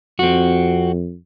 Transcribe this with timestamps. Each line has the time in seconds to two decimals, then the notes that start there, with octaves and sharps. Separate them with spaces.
0.19 F2 C4 F#4